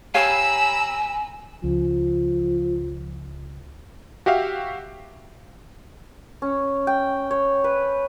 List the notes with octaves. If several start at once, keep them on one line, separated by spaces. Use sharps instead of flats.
G4 C#5 F5 G#5 A#5 B5 E6
C#2 F3
F#4 G4 E5 F5
C#4
G5
C#5
B4